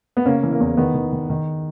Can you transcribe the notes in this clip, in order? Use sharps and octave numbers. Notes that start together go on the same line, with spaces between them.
B3
C#3 A#3 C#4
E3
A#3
E2
D#3 B3
D#3
D#3
D#3